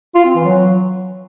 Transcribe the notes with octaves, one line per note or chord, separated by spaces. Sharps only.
F4
C4
E3
F#3